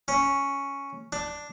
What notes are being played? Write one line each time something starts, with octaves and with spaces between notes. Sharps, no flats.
C#4
D4